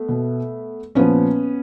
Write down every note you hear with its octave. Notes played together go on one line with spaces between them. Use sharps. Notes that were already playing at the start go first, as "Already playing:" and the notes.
Already playing: A3 B3
B2
A#2 F3 B3 C#4